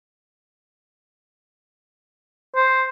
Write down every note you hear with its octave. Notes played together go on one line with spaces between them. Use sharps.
C5